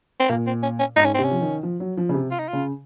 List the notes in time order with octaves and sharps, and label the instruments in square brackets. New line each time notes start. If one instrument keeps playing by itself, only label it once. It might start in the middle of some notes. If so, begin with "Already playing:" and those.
[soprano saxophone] C4
[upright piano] A#2 [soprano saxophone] A#3
[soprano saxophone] C4
C#4
C#4
[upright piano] G#2 [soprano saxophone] D#4
[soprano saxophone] C#4
C4
[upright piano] C3 [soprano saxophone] C#4
[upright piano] F3
D#3
F3
F#3
F3
C#3
C3
[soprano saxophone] F4
D#4
F4
[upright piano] C#3